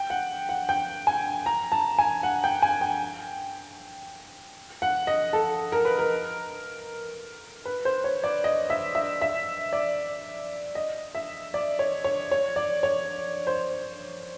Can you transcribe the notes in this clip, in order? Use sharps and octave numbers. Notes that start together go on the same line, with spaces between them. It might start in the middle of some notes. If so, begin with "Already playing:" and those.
Already playing: G5
F#5
F#5
G5
G#5
A#5
A5
G#5
F#5
G5
G#5
G5
F#5
D#5
A4
A#4
B4
A#4
B4
C5
C#5
D5
D#5
E5
E5
E5
D5
D#5
E5
D5
C#5
C#5
C#5
D5
C#5
C5